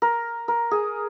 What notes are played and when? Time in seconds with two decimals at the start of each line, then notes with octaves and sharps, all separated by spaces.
0.02 A#4
0.48 A#4
0.71 G#4